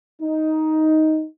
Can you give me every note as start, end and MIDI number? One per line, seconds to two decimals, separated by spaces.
0.22 1.24 63